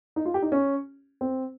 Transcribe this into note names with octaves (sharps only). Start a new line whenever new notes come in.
D#4
F4
G4
D#4
C#4
C4